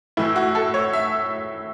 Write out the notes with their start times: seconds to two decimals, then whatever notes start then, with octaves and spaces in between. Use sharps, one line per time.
0.17 A2 E3 E4
0.36 F#4
0.55 A4
0.74 C#5
0.93 E5